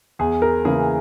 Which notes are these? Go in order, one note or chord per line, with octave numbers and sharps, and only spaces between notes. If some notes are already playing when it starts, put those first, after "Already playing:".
E2 G#4
A#4
C#3 E3 A#3 C#4 G#4